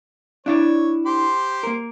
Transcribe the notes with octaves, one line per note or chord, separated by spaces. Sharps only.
D4 E4 C#5 D5
G4 C5 C6
A#3 A#4